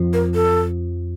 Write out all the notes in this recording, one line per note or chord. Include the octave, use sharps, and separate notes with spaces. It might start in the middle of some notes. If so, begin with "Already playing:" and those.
Already playing: F2 F3
A#4
A4